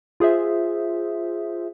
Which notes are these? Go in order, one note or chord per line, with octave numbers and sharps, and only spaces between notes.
F4 G#4 C5 E5